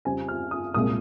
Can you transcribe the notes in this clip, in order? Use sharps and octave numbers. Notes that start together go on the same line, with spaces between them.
F2 C#3 G3 C4 G#5
F6
D#6
C2 A#2 G#3 D#6